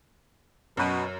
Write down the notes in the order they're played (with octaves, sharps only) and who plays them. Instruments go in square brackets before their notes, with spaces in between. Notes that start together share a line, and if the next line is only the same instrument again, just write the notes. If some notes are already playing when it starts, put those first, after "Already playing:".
[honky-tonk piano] F#2 D#7 [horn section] B2